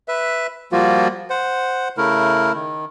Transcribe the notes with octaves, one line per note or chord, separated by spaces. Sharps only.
B4 E5
F3 G3 A#3 F4 F#4
C5 F#5
C#3 A3 E4 A#4
D#3